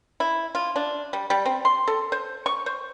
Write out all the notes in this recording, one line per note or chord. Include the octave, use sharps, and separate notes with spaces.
E4
F4
D4
G3
G3
C4
C6
A4
C5
C#6
C5